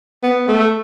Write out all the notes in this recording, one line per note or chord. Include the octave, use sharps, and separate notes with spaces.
B3
A3